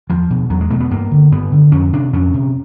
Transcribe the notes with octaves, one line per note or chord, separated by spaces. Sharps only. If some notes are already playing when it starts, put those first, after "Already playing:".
E2 F3
B2
E2 F#3
G#3
B2 A3
B3
G2 A#3
D3
G2 B3
D3
F2 C#4
C3 D4
F2 C#4
C3